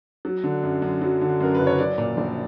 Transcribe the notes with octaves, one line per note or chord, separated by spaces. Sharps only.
F#3
D3
F#2
F#2
F#3
D3
F#2 A#4
F#1 B4
C#5
F#3 D5
A#2
A#1